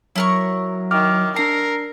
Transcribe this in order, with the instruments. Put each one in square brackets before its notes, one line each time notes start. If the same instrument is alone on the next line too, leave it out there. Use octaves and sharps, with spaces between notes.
[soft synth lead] F#3 [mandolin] E4 A#4 C#6
[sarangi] D#3 [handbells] D6 F6
[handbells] D4 C7 [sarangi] A#4 [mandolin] A#5